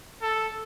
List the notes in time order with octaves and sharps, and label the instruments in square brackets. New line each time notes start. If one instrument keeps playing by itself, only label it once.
[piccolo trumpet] A4